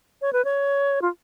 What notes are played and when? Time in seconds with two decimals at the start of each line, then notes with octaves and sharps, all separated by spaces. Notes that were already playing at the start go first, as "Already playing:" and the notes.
0.22 C#5
0.33 B4
0.45 C#5
1.02 F4